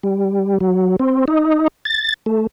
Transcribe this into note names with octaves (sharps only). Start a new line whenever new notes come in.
G3
F#3
C4
D#4
A6
A3